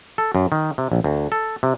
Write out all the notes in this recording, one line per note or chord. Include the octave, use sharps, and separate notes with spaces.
A4
F#2
D#3
C3
A#1
D2
A4
C3